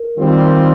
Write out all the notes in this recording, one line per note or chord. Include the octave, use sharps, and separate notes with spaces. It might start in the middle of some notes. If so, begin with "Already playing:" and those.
Already playing: A#4
D#3 G3 C4 F4